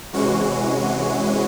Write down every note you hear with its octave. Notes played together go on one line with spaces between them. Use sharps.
C3 E3 G#3 C#4 F#4